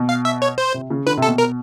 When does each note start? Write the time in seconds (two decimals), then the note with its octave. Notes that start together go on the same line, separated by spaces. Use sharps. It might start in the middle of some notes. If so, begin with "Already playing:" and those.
Already playing: B2
0.09 F5
0.25 E5
0.42 C#5
0.58 C5
0.74 C3
0.90 C#3
1.06 D3 B4
1.17 C3
1.22 A4
1.28 B2
1.38 A#4